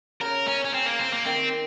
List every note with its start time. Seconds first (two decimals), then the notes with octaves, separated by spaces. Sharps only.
0.21 C#3 A#4
0.48 C#4
0.65 C#4
0.74 C4
0.86 A#3
1.00 C4
1.12 A#3
1.25 D#3 C4